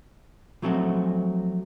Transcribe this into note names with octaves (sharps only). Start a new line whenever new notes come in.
F3 F#3 A3 C4 F#4